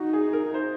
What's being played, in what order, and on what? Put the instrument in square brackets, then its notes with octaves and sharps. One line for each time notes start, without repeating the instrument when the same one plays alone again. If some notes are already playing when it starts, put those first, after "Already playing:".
Already playing: [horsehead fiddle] D#4 [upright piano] F#4
[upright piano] G#4
A#4
C5